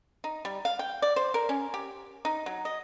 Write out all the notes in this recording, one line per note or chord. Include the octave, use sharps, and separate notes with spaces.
D#4
G3
F5
G5
D5
C5
A#4
C#4
G4
D#4
F#3
D#5